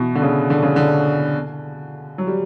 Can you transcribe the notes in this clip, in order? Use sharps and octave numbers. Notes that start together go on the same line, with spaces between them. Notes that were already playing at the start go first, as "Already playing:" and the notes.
Already playing: B2 E3
D3
C#3
D3
C#3
D3
F#3
G3